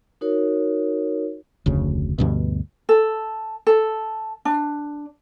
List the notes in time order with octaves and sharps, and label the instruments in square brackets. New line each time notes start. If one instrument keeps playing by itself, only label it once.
[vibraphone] D#4 F#4 A#4 C#5
[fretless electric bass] F1 D2 C#3
D2 G2 B2
[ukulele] A4
A4
D4